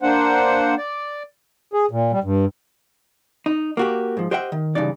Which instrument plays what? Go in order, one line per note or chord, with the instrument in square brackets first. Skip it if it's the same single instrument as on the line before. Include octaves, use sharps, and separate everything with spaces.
[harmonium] A#3 D4 C5 F#5
D5
G#4
A#2
G3
G2
[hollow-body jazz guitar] D#4
A#3 F#4 G4
G#2 F3
G4 C5 D#5 E5 F#5 G5
D#3
G2 C#3 E3 D#4 D5